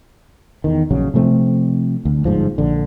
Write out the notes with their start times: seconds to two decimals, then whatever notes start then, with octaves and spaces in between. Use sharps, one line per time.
0.64 E2 D#3
0.91 A#1 C#3 F#3
1.14 C3 F3 A3 C4
2.05 D2
2.25 G1 G#2 F3
2.58 A#1 D3